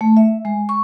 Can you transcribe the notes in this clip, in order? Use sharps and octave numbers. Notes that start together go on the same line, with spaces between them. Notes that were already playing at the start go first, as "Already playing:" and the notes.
A3
E5
G#3
C#6